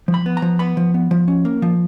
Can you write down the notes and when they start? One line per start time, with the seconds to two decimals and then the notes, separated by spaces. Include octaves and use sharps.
0.08 F3
0.14 B5
0.26 B3
0.37 A#5
0.42 F3
0.59 B3 B5
0.77 F3
0.94 B3
1.11 F3
1.28 C#4
1.45 A#3
1.62 F3